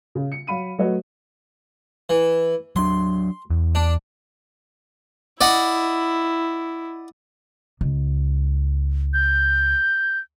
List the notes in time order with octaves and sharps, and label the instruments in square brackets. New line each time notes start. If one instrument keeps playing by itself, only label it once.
[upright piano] C#3
C#7
F#3 F5 B5 D#7
F#3 A3 F#4 B4 C#5 D#5
[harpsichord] E3
[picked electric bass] F#3 D4 [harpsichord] C6
[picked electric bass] E2
[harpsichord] D4
[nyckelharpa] E4 [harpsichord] D5 D#5 F#5
[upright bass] C#2
[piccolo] G6